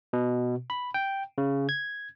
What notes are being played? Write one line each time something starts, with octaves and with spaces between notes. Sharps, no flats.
B2
B5
G5
C#3
G#6